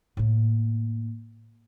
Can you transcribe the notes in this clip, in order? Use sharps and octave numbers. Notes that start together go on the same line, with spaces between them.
A2 A#3